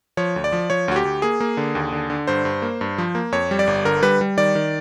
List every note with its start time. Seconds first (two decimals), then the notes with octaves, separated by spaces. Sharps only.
0.17 F3 C#5
0.36 D2
0.44 D5
0.52 F3
0.70 F3 C#5
0.88 D2 F#4
0.96 G4
1.05 D2
1.22 A#3 G#4
1.40 A#3
1.57 D3
1.75 D#2
1.92 D3
2.10 D3
2.27 G2 C5
2.45 G2
2.62 A#3
2.81 G2
2.98 F3
3.15 A#3
3.32 F2 C#5
3.51 G3
3.59 D5
3.67 G1
3.85 D3 A#4
4.03 G3 B4
4.21 G3
4.37 D#3 D5
4.55 D#3